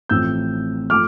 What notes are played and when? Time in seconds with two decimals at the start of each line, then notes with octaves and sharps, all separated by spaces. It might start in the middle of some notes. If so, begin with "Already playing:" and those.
0.09 A1 A2 F3 A3 C4 E6 G6
0.90 F3 A3 D6 F6